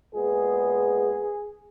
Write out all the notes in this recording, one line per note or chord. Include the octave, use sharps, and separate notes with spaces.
A#2 G#3 B3 G#4